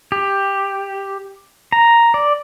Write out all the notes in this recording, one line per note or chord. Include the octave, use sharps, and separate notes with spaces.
G4
A#5
D5